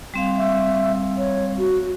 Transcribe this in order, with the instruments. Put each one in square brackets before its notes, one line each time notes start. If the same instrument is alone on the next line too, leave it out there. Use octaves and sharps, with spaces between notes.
[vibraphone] G3 C4 F5
[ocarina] E5
C#5
F#4